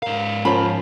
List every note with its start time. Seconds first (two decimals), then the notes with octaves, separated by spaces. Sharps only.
0.03 G#2 A#4 F5
0.45 F3 C#4 A#4 C#5 B5